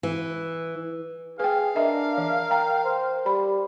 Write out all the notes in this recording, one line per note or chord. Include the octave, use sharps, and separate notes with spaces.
E3
G#4 B4 F5 G5
D4 A#4 D#5 E5
E3
G5 A#5
C5
G3 B5